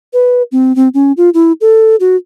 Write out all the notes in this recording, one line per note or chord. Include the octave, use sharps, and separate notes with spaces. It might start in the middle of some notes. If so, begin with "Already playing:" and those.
B4
C4
C4
C#4
F4
E4
A4
F#4